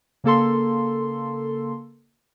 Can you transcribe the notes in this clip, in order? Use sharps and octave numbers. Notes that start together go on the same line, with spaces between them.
C#3 A#3 A4 C6